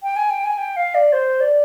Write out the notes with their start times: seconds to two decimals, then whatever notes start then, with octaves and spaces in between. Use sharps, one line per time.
0.03 G5
0.16 G#5
0.30 G5
0.44 G#5
0.58 G5
0.76 F5
0.95 D5
1.13 C5
1.40 D5